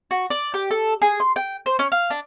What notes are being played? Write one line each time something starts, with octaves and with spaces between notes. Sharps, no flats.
F#4
D5
G4
A4
G#4
C6
G5
C5
C#4
F5
D4